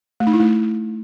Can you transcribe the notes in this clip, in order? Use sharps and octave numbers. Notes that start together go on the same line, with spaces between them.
A3
D#4
E4
A3